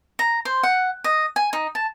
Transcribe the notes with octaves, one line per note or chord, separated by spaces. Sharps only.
A#5
C5
F#5
D#5
G#5
D#4
A5